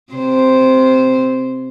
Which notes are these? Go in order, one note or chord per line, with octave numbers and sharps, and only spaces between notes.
C3 C5